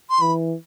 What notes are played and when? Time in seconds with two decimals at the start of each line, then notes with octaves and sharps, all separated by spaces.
0.10 C6
0.21 E3 B5